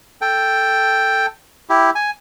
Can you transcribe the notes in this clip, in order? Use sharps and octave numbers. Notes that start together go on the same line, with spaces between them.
A4 G5
E4 G4
G#5